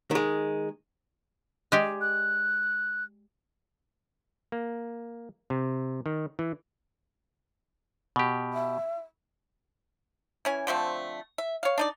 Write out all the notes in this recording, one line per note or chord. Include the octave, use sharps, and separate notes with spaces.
D#3 G#3
G#3 G4 D5
F#6
A#3
C3
D#3
E3
B2 G4
E5
E3 C#4 G#5
D3 F3 A3 C4
E5
C#5 F5
D4 D#4 D5